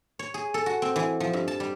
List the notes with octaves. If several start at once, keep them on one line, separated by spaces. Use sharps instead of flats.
C#5
G#4
A4
F#4
C4
E3
F3
G2
A5
G3